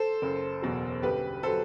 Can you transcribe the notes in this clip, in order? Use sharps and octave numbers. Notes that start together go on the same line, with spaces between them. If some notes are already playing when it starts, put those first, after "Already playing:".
Already playing: A4 C5
F#1
E2 B2 F#3
G1 G4 B4
F#3 A4 C5